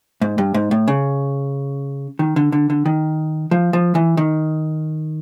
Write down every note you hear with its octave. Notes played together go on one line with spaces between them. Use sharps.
G#2
G2
G#2
A2
C#3
D#3
D3
D3
D3
D#3
F3
F3
E3
D#3